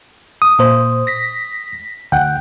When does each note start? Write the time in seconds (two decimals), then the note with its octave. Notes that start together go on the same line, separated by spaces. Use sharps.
0.42 D#6
0.59 A#2 C5
1.07 A#6 B6
2.12 D2 F#5 G5